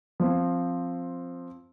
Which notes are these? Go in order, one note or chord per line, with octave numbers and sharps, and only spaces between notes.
F3 C4